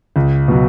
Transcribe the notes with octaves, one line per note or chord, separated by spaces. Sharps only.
C#2
B2 F#3